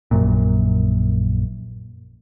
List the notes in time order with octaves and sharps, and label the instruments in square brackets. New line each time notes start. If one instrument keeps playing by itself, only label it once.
[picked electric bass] A#1 F#2 A#2